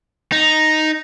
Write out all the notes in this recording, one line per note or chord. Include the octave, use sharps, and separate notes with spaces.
D#4